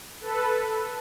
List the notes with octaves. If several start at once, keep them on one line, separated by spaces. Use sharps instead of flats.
A4 B4